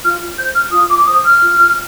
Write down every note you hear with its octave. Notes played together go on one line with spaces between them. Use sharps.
F4 F6
C5 G6
F6
F4 D#6
D6
C5 D#6
F6
F4